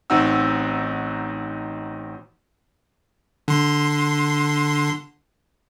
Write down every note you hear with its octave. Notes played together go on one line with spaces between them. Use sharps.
A1 C4 D#4 F#4 F#5 E6
D3 C6